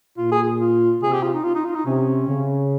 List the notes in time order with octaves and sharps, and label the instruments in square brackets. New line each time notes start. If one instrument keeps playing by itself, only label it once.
[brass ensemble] A#2 [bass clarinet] F4
[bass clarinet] G#4
F4
[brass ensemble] C3 [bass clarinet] G#4
[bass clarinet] G4
F4
D#4
F4
D#4
F4
D#4
[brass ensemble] C3 [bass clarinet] C#4
[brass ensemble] C#3